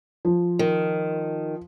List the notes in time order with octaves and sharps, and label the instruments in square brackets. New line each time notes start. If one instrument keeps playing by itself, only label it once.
[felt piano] F3
[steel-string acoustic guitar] D#3